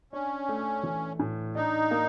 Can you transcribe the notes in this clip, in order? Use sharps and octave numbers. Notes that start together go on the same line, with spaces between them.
C#4 D4
A3
E3
A2
D4 D#4
A#3